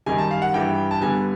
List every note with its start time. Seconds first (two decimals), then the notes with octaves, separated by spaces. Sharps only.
0.06 F#2 D#3 G3 G#5
0.18 A5
0.31 F5
0.42 F#5
0.54 G2 E3 G3 G5
0.91 A5
1.01 G2 D3 G3 B3 G#5